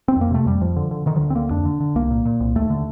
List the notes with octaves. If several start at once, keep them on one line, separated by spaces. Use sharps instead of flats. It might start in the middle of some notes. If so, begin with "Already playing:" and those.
C4
F2 A#3
C3 A3
F2 G3
F2 F3
D3
D3
D3 D#3
F3
D2
C4
D3 A#3
F2 D4
D3
D3
C2 A#3
A#2
A#2
C2
D#2 A3
D3